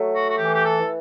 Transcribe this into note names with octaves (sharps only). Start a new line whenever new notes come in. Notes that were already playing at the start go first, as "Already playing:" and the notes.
Already playing: F#3 A3
F#4
F#4
E3 G4
G4
A4
E3